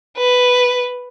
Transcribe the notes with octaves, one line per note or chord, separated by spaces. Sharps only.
B4